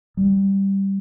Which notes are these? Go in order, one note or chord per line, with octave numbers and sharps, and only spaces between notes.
G3